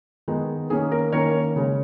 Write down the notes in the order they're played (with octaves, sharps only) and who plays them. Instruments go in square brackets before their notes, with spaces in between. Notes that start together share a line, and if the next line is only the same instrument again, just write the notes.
[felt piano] D#3 G#3 B3 D#4
D#3 A#3 C#4 G#4
A#4
D#3 A#3 C#4 A#4 C#5
C#3 G#3 C#4